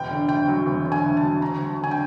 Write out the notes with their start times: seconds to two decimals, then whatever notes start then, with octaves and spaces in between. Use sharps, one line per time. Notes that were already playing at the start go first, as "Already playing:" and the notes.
Already playing: E1 G5
0.10 D3
0.29 D2 G5
0.48 F#3
0.66 E1
0.85 D3
0.92 G#5
1.04 D2
1.17 A5
1.23 F#3
1.41 D2 A#5
1.61 F#3
1.66 A5
1.80 D3 G#5
1.91 G5